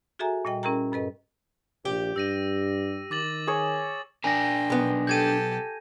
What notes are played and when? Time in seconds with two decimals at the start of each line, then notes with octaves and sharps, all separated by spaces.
0.19 F#4 G#4 A4 E5 G#5 A#5
0.45 A#2 G3 D#5 G5
0.63 C#4 E4 G#4 A#4 G5 A#5
0.92 G2 A4 B4 D#5
1.85 A#1 G4
2.16 G2 E6 A#6 D#7
3.11 D#3 D6 A6 F#7
3.47 G#4 C#5
4.24 D4 A#4 G5 G#5 A#6
4.70 B1 B3
5.07 G4 A4 G6 G#6 D#7